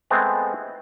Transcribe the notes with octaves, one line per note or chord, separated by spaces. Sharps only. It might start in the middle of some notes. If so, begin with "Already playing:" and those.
G#3 A3 B3 C4 G#4